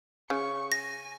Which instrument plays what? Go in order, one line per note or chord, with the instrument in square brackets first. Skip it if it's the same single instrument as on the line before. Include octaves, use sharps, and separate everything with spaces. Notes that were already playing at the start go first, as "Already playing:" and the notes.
[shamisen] C#3 [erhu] C#6
[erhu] G#5 [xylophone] A#6